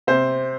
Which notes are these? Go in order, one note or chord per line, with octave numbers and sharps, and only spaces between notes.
C3 C5